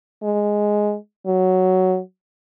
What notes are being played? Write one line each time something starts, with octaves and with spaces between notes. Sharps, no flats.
G#3
F#3